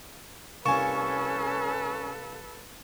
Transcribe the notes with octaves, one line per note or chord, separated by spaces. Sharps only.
C2 A#3 C#4 A4 B4 G#5 A5 C#6